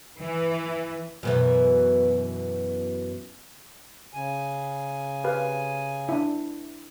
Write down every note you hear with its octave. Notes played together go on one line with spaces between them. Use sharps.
E3
F#2 B2 E3
C#3 G#5
G4 B4 F5
D4 E4